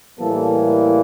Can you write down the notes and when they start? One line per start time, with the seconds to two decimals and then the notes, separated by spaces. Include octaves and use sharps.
0.20 A2 E3 G3 A#3 A4